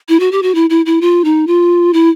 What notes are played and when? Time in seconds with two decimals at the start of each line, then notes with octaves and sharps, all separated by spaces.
0.09 E4
0.20 F#4
0.32 G4
0.43 F#4
0.55 E4
0.70 E4
0.86 E4
1.01 F4
1.25 D#4
1.47 F4
1.93 E4